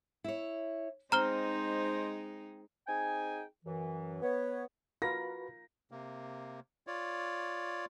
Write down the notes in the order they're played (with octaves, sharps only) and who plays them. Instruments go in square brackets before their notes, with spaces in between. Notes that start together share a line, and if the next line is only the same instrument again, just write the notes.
[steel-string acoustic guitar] E4 C#5
[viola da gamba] G#3 D#4 [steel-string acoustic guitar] C4 [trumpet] C5 [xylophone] A#5 F6 G7
[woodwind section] C4 D#4 G#4 G5 G#5
F#2 E3
B3 C#5
[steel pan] F4 A#4 [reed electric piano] F#4 B4 B5 [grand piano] A#6
[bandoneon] C3 A#3
F4 C#5 D5